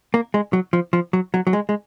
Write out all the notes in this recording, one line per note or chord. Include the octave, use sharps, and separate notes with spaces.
A#3
G#3
F#3
F3
F3
F#3
F#3
F#3
G#3
G#3